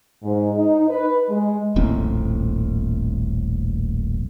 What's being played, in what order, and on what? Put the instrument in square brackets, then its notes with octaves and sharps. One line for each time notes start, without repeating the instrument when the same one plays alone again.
[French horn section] G#2
D#4
B4
G#3
[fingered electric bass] D#1 A#1 A2 C4